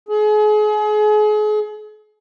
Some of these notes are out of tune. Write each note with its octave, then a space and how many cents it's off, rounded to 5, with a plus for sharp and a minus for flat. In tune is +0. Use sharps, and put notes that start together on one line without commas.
G#4 +35